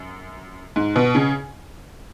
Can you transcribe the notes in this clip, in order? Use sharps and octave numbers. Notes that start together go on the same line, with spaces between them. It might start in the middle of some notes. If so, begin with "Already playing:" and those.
Already playing: F#2
G#2
B2
C#3